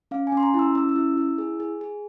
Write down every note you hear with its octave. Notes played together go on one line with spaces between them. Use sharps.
C#4 F5
G#5
C#4
C6
A#5
E4
E6
C#4 E6
E6
E4
E4
G#4
G#4
G#4